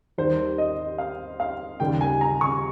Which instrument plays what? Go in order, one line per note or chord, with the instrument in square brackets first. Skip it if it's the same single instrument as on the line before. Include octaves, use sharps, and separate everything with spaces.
[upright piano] D#2 D#3 G3 C5
D#5
F5
F5
D#2 C#3 G3 G5
G#5
A#5
C#6